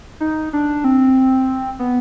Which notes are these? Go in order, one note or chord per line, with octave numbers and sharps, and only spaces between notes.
D#4
D4
C4
B3